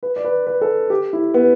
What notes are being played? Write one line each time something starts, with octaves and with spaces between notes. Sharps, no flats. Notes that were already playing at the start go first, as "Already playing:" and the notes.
B4
D5
B4
B4
A4
G4
E4
B3